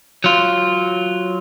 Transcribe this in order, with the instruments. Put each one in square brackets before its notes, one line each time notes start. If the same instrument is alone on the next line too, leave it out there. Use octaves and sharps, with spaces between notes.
[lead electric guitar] F#3 F4